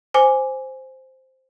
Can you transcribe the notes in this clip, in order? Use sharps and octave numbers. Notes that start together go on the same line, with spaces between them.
C5 G#5 D6